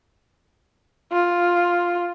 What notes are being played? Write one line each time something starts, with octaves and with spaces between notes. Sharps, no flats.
F4